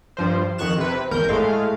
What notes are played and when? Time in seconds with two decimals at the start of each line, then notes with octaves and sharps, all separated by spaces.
0.17 G2 F3 C5
0.58 F2 D#3 C#6 F#6 E7
0.78 C3 B4
1.11 G#1 E2 A#4 G6
1.29 A2 G#3 A3 F5